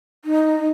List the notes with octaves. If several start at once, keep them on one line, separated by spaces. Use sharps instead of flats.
D#4